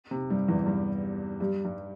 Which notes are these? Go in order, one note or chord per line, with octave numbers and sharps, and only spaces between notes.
C3
G2 G3
E2 E3
G2 G3
G2 G3
G2 G3